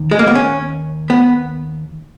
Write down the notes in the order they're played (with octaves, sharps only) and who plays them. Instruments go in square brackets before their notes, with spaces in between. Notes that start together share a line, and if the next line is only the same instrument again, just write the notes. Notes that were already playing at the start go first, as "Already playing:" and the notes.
Already playing: [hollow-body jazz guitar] D#2 D#3
G#3
A#3
B3
C#4
B3